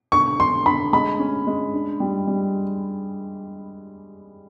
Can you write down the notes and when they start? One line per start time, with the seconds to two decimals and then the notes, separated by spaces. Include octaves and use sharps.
0.12 D3 C#6
0.39 D3 C6
0.66 D3 B5
0.93 G#3 B5
1.20 C#4
1.47 G#3
1.73 D4
2.00 G3
2.27 G3